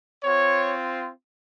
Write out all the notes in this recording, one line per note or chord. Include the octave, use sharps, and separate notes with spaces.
C4 F4 C#5